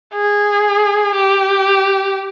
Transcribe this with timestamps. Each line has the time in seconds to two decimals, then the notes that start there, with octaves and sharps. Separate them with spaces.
0.14 G#4
1.15 G4